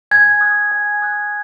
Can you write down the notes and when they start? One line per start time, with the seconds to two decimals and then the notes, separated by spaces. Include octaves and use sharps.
0.11 G#5 G#6
0.41 D#6 F#6
0.72 G#5
1.02 D#6 F#6